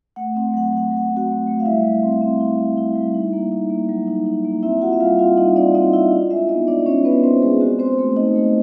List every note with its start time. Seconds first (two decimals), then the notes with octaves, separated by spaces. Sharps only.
0.16 A3 F#5
0.35 C4 F#5
0.54 F#3 F#5
0.73 F#3 F#5
0.91 F#3
0.97 F#5
1.10 C4
1.17 F#4 F#5
1.28 A3
1.47 A3
1.60 F5
1.65 G3 E4 E5
1.84 G3
2.03 C4
2.22 C4
2.40 E4
2.59 C4
2.77 E4
2.96 G3
3.14 D#4
3.33 A#3
3.52 D#4
3.70 A#3
3.89 F#3
4.07 D#4
4.26 D#4
4.45 A#3
4.63 C4 E4 E5
4.81 F4 F#4 F#5
4.93 E5
5.00 G3 F4 F5
5.19 C4 F4 F5
5.37 G3 D#4 D#5
5.56 C4 D4 D5
5.75 C4 D#4 D#5
5.93 E4 F4 E5
6.12 D4
6.30 G#3 E4 E5
6.49 B3 D#4 D#5
6.67 G#3 D4 D5
6.86 G#3 C#4 C#5
7.05 B3 B4
7.23 B3 C4 C5
7.42 G#3 G#4
7.61 C4 F#4
7.79 C4 C5
7.98 A3
8.16 C4 D#4 D#5
8.35 A3